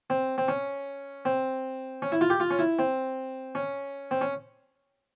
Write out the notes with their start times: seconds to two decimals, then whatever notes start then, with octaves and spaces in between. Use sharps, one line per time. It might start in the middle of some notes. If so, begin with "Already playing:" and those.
0.10 C4
0.38 C4
0.48 C#4
1.25 C4
2.02 C#4
2.12 E4
2.21 F4
2.30 G4
2.40 F4
2.51 C#4
2.59 E4
2.79 C4
3.55 C#4
4.11 C4
4.21 C#4